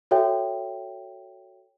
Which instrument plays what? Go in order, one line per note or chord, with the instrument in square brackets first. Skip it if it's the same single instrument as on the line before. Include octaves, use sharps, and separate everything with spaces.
[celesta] F#4 A4 C#5 E5 G5